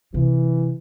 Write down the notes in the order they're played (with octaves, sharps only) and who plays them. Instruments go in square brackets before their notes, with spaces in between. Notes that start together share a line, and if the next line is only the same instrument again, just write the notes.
[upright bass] C3 [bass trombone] E3